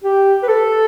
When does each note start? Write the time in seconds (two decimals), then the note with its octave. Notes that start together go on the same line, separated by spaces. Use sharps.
0.03 G4
0.42 B4
0.48 A4